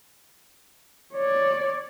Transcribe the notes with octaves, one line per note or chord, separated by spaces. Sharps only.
C#5 D5